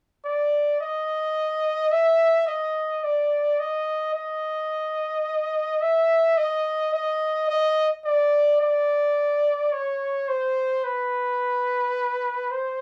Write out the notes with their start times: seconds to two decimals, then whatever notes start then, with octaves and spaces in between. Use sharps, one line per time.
0.25 D5
0.81 D#5
1.92 E5
2.47 D#5
3.04 D5
3.60 D#5
4.15 D#5
5.82 E5
6.37 D#5
6.94 D#5
7.49 D#5
8.05 D5
8.61 D5
9.73 C#5
10.28 C5
10.85 B4
12.51 C5